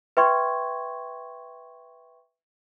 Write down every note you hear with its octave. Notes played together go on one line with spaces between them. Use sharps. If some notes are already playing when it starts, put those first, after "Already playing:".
B4 E5 G5 C6 C#6 G#6